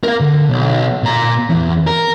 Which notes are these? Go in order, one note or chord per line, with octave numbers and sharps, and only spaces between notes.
A#4 F5
D3
B1
A#2 A#5
E2
A#4